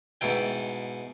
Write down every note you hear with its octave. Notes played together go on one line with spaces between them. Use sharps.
G#2 B2 E4 G5